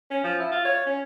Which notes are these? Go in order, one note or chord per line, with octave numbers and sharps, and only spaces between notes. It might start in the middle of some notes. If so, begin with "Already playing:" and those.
C#4
F3
E4
F4
C#5
C#4